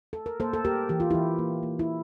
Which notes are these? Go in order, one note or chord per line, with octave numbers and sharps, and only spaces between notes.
A4
A#4
A#3 A4 C5
A4
A#3 G4 A#4
E3 G4
F4
E3 E4 G4
A#3
A#3
E4